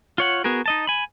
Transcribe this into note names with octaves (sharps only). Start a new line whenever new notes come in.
F4 C#5 F#5
B3 F#4 G#4 A#4
D#4 D#5 A5
G#5 B5